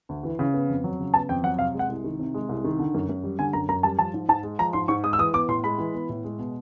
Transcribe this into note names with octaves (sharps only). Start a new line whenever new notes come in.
D2
E3
C#3
B3
F2
F#3
C#3
B3 A5
F2 G5
F#3 F#5
C3 F5
G#3
F#5
C2
D#3
C3
G#3
C2
D#3
D3
F#2
F#2
G3
D3 G#5
F#2 A#5
F#2 A#5
G3 A5
F3 A5
G#2
G#2 A5
G#3
F3 A#5
G#2 C6
G#2 C#6
G#3 D#6
E6
E3 D#6
B3 D6
A2 C6
G#3 B5
E3
B3
A2
G#3
B2